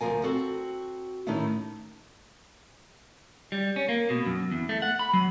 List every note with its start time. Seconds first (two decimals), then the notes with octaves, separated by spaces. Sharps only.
0.01 D2 G2 F3 A#4 G#5
0.23 C4 F#4 A4
1.27 A2 D#3 A3 C#4 D#4 E4
3.52 G3
3.76 C#4
3.89 A#3
4.10 B2
4.26 F#2
4.52 E2
4.69 A3
4.82 F#5
4.99 B5
5.13 F#3